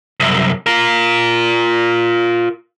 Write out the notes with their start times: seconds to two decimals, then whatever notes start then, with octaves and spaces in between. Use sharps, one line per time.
0.20 C2 F#2
0.67 F4 A#4